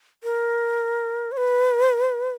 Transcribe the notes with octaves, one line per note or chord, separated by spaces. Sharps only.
A#4
C#5
B4